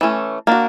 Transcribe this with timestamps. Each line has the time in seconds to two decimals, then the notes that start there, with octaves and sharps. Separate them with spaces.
0.01 E3 A3 C#4
0.47 A#3 D4 F#4